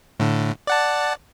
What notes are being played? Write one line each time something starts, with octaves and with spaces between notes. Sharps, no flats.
A2 D3
D5 F#5 A5